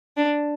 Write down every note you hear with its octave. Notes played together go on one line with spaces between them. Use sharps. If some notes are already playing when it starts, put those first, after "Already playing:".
D4